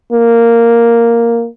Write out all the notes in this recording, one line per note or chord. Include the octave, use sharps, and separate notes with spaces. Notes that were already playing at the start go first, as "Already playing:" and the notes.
A#3